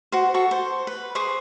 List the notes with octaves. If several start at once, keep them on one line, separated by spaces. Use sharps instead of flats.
F#4 C5
F#4 A4 C#6
C5
B4
G#4 C5 C#6 D6